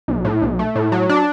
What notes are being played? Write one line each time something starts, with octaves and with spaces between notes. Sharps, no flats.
B1
A2
B1
A3
A2
F#3
D4